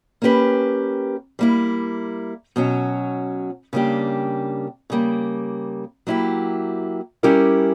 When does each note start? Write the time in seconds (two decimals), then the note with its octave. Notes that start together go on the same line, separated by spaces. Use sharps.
0.22 A#3 C#4 G4 B4
1.39 G3 A#3 E4
2.56 B2 F#3 C#4 F#4
3.73 C#3 G3 A#3 D4 G4
4.90 C#3 G3 A#3
6.07 F#3 A#3 E4 G4
7.23 G3 C#4 E4 G4 A#4